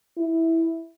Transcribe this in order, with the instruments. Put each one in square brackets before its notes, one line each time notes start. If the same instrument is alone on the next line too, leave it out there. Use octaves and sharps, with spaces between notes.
[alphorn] E4